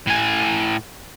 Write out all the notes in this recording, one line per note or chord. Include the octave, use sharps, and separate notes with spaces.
A2 G#5